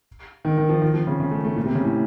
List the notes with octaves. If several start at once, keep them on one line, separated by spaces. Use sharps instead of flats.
D#3
D#3
F3
D#3
F3
C#3
C#3
A3
A3
A#2
C3
C#3
A2